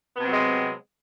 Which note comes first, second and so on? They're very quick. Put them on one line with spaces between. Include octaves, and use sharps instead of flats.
B3 C3 C4 F#3 G#3